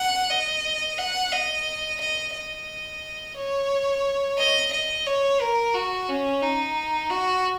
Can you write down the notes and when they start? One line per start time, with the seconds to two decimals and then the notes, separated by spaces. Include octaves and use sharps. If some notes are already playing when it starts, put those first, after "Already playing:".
Already playing: F#5
0.30 D#5
0.98 F#5
1.32 D#5
2.01 D#5
2.34 D#5
3.37 C#5
4.38 D#5
4.72 D#5
5.06 C#5
5.41 A#4
5.74 F#4
6.09 C#4
6.42 D#4
7.10 F#4